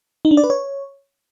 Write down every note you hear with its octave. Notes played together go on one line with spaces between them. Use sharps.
D#4
D4
D5
B4
C#5